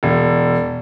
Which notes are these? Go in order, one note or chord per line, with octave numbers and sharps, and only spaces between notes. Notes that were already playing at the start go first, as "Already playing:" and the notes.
E1